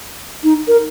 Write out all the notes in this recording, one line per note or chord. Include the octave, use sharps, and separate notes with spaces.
D#4
A#4